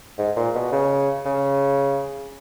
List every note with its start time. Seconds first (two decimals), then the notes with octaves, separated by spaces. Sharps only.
0.18 G#2
0.36 A#2
0.55 B2
0.72 C#3
1.26 C#3